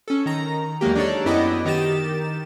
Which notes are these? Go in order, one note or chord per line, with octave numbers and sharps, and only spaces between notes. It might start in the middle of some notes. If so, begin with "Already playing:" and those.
C#4 A4
D#3 A#5
E2 F#3 G#3 A#3 G4
D4 D#4 A4 C#5 D5
F#2 B3 E4 D#5 G5 D6
D#3 D#4 G4 A6 E7